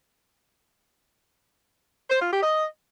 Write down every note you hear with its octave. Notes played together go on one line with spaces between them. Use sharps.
C5
F4
G4
D#5